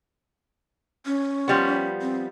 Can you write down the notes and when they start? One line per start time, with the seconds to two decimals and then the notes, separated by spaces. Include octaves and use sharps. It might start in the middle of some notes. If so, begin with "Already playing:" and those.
1.06 C#4
1.48 F3 G3 B3
2.01 C4